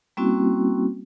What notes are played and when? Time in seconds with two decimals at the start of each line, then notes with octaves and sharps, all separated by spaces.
0.17 G3 A#3 C4 C#4 E4 F#4